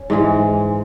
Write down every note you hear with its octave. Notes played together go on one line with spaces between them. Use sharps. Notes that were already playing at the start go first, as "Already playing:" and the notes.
Already playing: C#4
G#2 E3 G#3